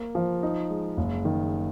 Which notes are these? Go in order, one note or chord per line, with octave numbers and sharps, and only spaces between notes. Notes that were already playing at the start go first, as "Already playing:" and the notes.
Already playing: A#3
F3
D#4
G#3
F#1
D#3